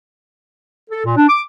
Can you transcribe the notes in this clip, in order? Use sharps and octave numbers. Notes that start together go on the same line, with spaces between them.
A4
A#2
D4
D6